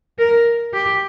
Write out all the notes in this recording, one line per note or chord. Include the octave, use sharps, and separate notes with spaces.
A#4
G4